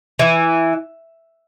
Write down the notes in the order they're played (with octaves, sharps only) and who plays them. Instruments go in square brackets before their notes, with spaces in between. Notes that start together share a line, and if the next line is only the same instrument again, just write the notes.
[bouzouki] E3